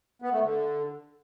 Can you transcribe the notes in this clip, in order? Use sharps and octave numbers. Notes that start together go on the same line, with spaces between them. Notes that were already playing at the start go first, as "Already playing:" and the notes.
B3
A3
D3